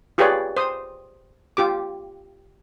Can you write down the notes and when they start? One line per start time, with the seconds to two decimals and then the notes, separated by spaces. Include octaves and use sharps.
0.18 F4 G4 G#4 B4 C#5 D5
0.57 C5 D#6
1.57 F4 G4 D6